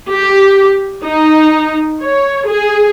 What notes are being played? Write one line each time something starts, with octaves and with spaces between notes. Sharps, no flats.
G4
D#4
C#5
G#4